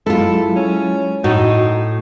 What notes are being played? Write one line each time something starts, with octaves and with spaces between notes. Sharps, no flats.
F#3 G#3 E4 F4 A4
C#4
A2 D#4 F#4